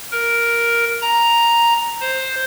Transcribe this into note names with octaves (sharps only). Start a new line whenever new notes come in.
A#4
A#5
C5